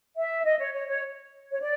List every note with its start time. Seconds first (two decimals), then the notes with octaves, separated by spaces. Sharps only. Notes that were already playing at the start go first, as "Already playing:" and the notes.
0.16 E5
0.45 D#5
0.59 C#5
0.74 C#5
0.88 C#5
1.52 C#5
1.61 D5